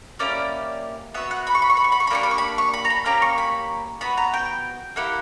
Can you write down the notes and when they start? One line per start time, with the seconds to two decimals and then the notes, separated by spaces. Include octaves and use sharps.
0.19 A#3 C#4 E4 G4 D5
1.14 B3 F#4 E5
1.31 F#5
1.47 B5
1.55 C#6
1.62 B5
1.70 C#6
1.77 B5
1.84 C#6
1.92 B5
2.00 C#6
2.07 B5
2.10 A#3 D4 G4 C#6
2.23 B5
2.31 C#6
2.38 B5
2.58 C#6
2.74 B5
2.85 A#5
2.90 B5
3.05 A#3 C#4 G4 A#5
3.22 C#6
3.38 B5
4.01 B3 F#4 B5
4.17 A#5
4.34 G5
4.96 A#3 E4 G4 F#5